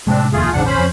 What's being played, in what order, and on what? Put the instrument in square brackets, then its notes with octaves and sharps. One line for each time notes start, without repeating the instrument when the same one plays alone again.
[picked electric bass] A2 C3 G#3 [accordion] C4 D4
[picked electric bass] F1 D#2 [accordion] A3 F4 G#4
[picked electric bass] E1 A1 C#3 [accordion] G#2 D4 F#5
[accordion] C#4 C5 B5
[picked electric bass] F2